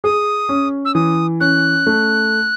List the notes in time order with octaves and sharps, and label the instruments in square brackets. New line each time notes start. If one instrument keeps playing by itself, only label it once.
[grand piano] G#4 [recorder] D#6
[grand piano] C#4
[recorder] E6
[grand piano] E3 [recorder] D#6
[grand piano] C#4 [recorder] F#6
[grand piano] A3